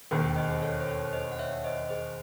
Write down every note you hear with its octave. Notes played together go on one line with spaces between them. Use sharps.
E1 D#2 D#3 G#4 C5
C5 D#5
C5
A4 C#5
C5
A4 C#5
C5 D#5
F#5
C#5 E5
C5 D#5
G#4 C5